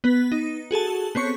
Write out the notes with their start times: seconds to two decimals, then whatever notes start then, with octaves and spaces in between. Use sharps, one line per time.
0.04 B3 B4
0.32 D#4
0.71 F#4 G#4 A4 A5
1.15 B3 C4 C#5 C#6 C#7